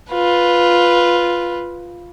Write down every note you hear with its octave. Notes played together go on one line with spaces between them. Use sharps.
F4 B4